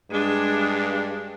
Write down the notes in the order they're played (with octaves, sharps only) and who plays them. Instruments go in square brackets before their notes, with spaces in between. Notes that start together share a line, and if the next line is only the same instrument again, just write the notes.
[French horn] G2 [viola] G#3 D4